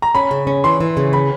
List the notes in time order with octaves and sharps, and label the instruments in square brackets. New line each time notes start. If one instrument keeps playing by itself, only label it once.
[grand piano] A#5
[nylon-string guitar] C#4 [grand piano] B5
[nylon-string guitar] C#3
C#4
[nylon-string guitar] E3 [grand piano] C6
[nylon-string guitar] E3
C#3
[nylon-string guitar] C#4 [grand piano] B5